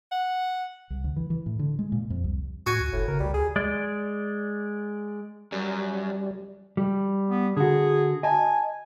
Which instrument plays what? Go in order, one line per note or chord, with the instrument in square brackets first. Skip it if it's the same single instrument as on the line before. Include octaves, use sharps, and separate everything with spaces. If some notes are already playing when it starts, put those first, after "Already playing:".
[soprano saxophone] F#5
[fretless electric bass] C2
D2
E3
E3
A2
D3
G#3
A#2
F2
C2
[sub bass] A2 [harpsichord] F#4 G#5 C#6
[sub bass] D2
[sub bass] F#1 [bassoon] A2
[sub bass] C#3 [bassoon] A#4
[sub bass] C2 [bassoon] G3
[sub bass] D2 [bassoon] G#4
[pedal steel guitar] G#3 D5
[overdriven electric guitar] F#2 [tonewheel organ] G3
[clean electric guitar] G3
[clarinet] B3
[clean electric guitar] D3 F#4 [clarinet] G#4
[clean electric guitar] D#5 A5 [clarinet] G#5